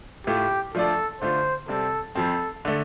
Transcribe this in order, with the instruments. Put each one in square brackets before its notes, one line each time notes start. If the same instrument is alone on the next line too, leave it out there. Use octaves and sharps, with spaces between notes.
[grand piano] A2 A3 F4 [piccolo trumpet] G4
[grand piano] F3 A3 D4 F4 D5 [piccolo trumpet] A4
[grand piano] D3 A3 F4 [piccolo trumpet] C5
[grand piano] C3 G3 C4 [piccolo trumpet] A4
[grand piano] F2 F3 C4 [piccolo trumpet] A4
[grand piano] D3 A3